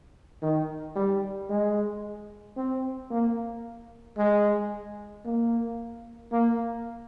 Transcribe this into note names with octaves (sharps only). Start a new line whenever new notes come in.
D#3
G3
G#3
C4
A#3
G#3
A#3
A#3